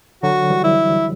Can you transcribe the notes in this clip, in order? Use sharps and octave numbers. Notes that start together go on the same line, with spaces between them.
D3 F#3 F#4
E3 G3
E4